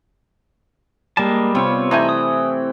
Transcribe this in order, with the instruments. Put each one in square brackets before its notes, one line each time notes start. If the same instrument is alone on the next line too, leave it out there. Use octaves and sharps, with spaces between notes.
[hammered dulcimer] G3 [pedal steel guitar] G#3 A#3 A5
[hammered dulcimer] C3 C4 [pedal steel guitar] B3 F4 C#5
[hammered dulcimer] E3 A3 G5 [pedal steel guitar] D#4 G#5
[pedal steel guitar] D#6